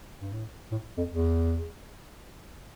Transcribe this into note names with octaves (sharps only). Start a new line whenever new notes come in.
G2
A2
A2
F2
E2